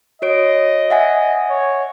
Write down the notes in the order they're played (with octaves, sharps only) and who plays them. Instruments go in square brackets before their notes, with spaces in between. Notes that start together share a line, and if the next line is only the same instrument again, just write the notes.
[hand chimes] F#4 C#5 D7 [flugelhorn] D#5
[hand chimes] E5 F#5 G#5
[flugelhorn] C#5